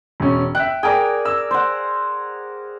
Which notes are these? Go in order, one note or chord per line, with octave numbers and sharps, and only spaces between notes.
E1 C#4
E5 G5 F#6
G#4 A#4 D5 G5
E6
C5 F#5